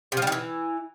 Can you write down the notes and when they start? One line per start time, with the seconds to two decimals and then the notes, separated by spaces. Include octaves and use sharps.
0.12 C3
0.17 F3
0.22 G3
0.27 D#3
0.32 E3